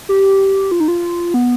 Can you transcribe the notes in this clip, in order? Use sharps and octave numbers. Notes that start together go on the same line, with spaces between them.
G4
F4
D#4
F4
B3